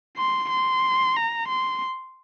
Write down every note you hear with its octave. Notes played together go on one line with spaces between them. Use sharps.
C6
C6
A#5
C6